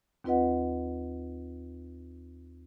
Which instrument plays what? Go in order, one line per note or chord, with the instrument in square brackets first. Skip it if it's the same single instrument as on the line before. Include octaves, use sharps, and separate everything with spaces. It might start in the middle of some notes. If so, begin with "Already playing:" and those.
[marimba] D#2 C4 F4 B4 D#5 F#5